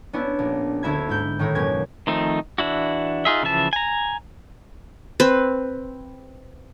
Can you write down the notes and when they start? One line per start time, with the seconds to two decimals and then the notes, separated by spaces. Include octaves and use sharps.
0.13 B3 C#4 D4 E4
0.39 A#1
0.83 D2 E4 E5 B5 G#6
1.09 G#2 E4 G6
1.39 A2 D#3 D#4 E4
1.55 F#2 B2 A#3 C#4 G#6
2.07 D#3 F3 A3 C4 D#4
2.58 E3 D4 E4 F#4
3.25 D#4 F4 G#4 E5
3.43 C#3 E3 F3 E5 A5
3.73 G#5 A#5
5.20 C4 B4 B5